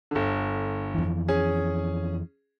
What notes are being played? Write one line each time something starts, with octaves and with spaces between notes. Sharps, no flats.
G1 D3
F2 E3
C#4 G#4